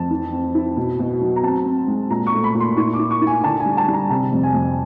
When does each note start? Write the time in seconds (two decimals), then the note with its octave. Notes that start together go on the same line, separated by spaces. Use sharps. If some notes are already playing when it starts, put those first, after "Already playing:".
Already playing: F2 A5
0.10 E3
0.33 C4
0.55 E4
0.77 B2
0.99 B2
1.21 F#3
1.36 A#5
1.44 C4 A5
1.66 C4
1.88 G#3
2.10 A#2 A#5
2.26 C#6
2.33 A3
2.44 B5
2.55 A#2
2.60 C6
2.77 E4 C#6
2.93 D6
2.99 E4
3.11 C#6
3.22 E4
3.27 G#5
3.44 D3 A5
3.60 G#5
3.66 G3
3.77 A5
3.88 G3
3.93 A#5
4.10 C3 A5
4.32 F2
4.43 G#5
4.54 F2